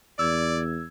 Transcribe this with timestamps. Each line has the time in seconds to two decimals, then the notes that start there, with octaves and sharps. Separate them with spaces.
0.19 E2 D5 E6 G#6